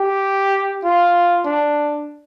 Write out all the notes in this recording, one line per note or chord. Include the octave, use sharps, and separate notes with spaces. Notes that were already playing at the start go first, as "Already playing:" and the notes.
Already playing: G4
F4
D4